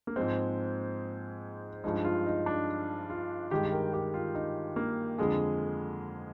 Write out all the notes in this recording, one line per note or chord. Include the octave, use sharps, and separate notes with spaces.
A#3
G#2 F3 G#3 C4
G2 F3 G#3 D#4
F4
D#4
D4
F4
G2 D#3 G#3 G4
A#4
G4
F4
D#4
A#3
F2 D3 G#3 G#4